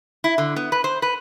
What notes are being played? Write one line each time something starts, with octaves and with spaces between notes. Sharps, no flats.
E4
D3
B3
B4
C5
B4